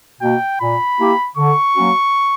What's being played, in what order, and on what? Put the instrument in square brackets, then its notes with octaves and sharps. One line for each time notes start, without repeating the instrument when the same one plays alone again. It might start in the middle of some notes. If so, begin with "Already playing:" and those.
[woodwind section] B2 A#3 [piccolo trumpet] G5
[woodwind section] A#2 [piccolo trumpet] B5
[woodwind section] A#3 E4 G4
[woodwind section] D3 [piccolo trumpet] C#6
[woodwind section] F#3 A#3 C#4 F#4